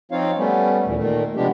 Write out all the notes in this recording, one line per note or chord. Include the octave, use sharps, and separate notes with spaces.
F3 C4 D#4 F4 C#5 F5
G3 A3 B3 C#4
D#2 A#2 E3
A#2 D#3 A3
C3 F3 G#3 B3 D4 G4